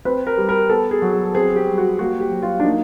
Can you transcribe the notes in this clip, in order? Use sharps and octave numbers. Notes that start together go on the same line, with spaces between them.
C4 B4
A#4
G3
A#4
B3 A4
G#4
F#3
G#4
C4 G#4
G4
G3
F#4
A#3 F#4
G4
F#3
F4
D4
A#3 D#4